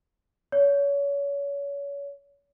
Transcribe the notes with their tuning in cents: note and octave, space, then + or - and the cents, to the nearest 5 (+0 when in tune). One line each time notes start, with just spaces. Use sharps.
C#5 +30